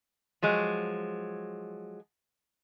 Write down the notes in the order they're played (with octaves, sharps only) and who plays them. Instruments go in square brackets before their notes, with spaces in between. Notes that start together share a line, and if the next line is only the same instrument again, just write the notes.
[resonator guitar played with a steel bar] F3 F#3 G#3